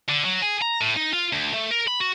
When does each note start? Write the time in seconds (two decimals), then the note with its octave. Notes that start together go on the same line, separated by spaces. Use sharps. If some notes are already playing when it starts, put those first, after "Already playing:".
0.09 D3
0.25 F#3
0.42 G#4
0.62 A#5
0.81 A2
0.97 D#4
1.13 F4
1.33 D2
1.54 A3
1.71 A#4
1.88 B5
2.00 F#4